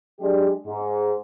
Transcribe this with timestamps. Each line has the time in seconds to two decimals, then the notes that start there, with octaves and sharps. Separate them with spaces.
0.20 F#3 G#3 D4 G4
0.66 G#2